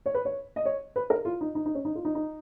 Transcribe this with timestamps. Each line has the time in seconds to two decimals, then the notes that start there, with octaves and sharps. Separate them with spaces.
0.06 C#5
0.14 B4
0.25 C#5
0.56 D#5
0.65 C#5
0.96 B4
1.10 A#4
1.25 F4
1.41 D#4
1.55 D#4
1.66 D#4
1.75 C#4
1.85 D#4
1.95 F4
2.05 D#4
2.15 D#4